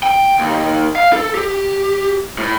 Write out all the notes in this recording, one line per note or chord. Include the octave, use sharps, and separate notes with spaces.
G5
D#2
F5
A4
G4
A2